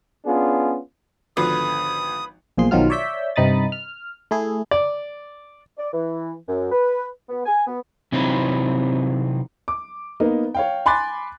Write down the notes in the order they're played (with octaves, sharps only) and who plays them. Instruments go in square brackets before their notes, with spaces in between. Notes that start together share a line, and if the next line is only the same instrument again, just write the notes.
[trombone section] B3 C#4 D4 F4 G#4
[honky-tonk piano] G#1 D3 B3 [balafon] F3 F4 F#4 [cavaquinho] B4 [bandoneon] D#6
[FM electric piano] B1 A#2 F3 G#4 C6
B1 D#3 F3 F#3 F4 F6
C#5 D5 E5 G6 B6
G2 C3 D#4 B5 D#6 A6
F6
A3 E4 G#4
[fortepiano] D5
[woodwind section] D5
E3
F#2
B4
B3
G#5
B3
[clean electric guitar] C3 E3 F#3 C4 D#4 B4
[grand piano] D6
A#3 B3 D#4 A#4
C#5 F5 G5
G#5 B5 C6 D6 F#6 A6